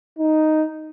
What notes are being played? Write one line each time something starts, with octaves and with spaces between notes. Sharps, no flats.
D#4